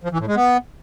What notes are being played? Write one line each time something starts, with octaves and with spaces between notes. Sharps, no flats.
F3
E3
A2
G#3
B3